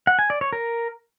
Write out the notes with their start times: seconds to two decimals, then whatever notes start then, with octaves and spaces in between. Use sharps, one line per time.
0.07 F#5
0.19 G#5
0.30 D5
0.41 C#5
0.53 A#4